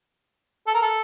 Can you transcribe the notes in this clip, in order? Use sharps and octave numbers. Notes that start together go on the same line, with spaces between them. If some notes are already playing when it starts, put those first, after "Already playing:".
A4
A#4
A4